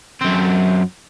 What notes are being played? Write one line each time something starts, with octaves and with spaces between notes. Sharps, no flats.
F#2 C4